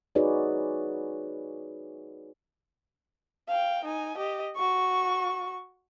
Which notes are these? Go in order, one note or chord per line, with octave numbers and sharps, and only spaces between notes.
D#4 F#4 G#4 B4 C#5 D5
F5 G5
D#4 G#5
G4 D#5
F#4 C#6